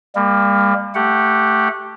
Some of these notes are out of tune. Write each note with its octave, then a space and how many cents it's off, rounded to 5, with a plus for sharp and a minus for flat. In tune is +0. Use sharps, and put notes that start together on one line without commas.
G3 +40 A#3 +0
A3 +0 G4 +0 F#5 -15